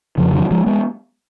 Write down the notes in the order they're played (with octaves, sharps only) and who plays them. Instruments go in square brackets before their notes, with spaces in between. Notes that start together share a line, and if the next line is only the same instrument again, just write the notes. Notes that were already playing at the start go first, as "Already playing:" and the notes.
[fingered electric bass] F2 C#3 F3
D#3 F#3
F3 G#3
G#3 B3